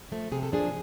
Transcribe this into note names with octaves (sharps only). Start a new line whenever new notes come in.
F3 A3
C3 G#4
A4
F3 A#3 D4 G#4